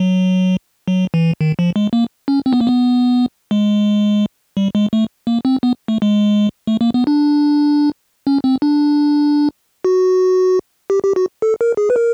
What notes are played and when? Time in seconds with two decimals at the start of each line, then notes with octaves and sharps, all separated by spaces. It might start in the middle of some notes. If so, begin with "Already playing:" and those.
Already playing: F#3
0.88 F#3
1.14 E3
1.41 D#3
1.59 F3
1.76 G#3
1.93 A#3
2.28 C#4
2.46 C4
2.53 B3
2.61 A#3
2.67 B3
3.51 G#3
4.57 G3
4.75 G#3
4.93 A3
5.27 A#3
5.45 C4
5.63 B3
5.88 A3
6.02 G#3
6.67 A3
6.81 A#3
6.94 B3
7.07 D4
8.27 C#4
8.44 C4
8.62 D4
9.84 F#4
10.90 G4
11.04 G4
11.16 F#4
11.42 A4
11.61 A#4
11.77 G#4
11.90 B4
11.96 A#4